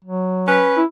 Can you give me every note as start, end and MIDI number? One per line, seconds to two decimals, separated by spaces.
0.04 0.66 54
0.48 0.80 61
0.48 0.80 71
0.77 0.85 64